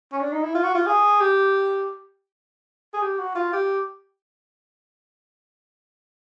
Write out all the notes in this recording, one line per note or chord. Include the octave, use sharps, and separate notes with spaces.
C#4
D4
D#4
E4
F4
F#4
F4
G#4
G4
G#4
G4
F#4
F4
G4